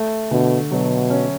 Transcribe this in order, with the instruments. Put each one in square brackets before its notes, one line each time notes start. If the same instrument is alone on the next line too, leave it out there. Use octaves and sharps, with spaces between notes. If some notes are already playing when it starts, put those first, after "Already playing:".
Already playing: [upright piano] A3
[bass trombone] B2 [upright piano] D3
[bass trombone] B2 [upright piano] F#3
[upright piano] C#4